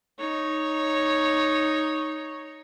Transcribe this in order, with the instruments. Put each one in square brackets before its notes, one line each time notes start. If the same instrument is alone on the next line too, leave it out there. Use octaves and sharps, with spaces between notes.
[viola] D#4 C#5